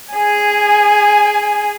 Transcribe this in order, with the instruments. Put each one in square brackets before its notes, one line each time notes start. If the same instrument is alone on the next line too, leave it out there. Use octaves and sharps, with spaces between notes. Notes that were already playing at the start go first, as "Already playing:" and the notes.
[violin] G#4 G#5